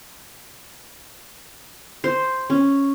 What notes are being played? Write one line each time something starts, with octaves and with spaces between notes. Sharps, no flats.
C5
C#4